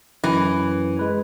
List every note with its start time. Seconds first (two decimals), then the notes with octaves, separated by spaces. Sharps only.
0.24 F#2 E3
0.99 G#3 B4